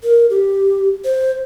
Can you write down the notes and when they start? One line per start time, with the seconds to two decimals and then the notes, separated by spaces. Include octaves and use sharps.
0.04 A#4
0.30 G4
1.04 C5